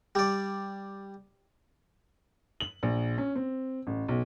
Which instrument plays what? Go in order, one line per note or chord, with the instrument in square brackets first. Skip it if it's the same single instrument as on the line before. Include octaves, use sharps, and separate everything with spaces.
[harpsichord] G3 D5
[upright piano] F#7
A#1
C#4
C4
A1
B1